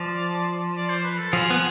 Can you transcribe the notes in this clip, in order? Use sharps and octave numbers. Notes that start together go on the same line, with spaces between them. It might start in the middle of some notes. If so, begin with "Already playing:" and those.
Already playing: F3 D5
D5
C5
B4
A4
F3 G#4
B3